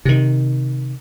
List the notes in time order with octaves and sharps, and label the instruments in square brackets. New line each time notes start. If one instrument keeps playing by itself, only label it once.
[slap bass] C3 D#3